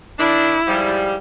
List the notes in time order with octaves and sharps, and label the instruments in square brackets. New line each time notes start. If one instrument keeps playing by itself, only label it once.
[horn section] D#3 D4 [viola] E4
[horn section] G#2 F3 G3